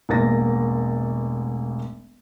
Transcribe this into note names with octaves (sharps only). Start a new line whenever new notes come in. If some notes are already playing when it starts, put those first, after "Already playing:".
E1 A1 A#3 A6 A#6